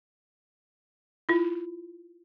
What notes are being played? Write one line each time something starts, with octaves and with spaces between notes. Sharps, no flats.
E4 F4